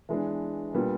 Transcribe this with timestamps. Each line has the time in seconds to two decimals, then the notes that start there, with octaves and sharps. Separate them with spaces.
0.09 E3 G#3 B3 D4
0.73 A#2 G3 B3 D4